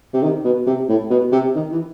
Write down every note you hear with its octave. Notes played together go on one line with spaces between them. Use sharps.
C3
D#3
B2
C3
A2
B2
C3
D#3
E3